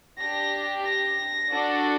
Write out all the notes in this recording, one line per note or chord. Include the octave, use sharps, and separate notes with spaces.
D4 G4 A#6
A#6
D4 F#4 A4